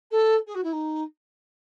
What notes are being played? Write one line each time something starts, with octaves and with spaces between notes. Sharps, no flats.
A4
G#4
F#4
E4
D#4